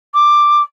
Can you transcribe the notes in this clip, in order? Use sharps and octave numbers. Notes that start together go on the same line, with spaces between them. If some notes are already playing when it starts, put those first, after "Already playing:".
D6